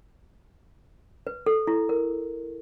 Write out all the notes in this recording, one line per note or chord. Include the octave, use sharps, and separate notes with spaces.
B4
A4
E4
A#4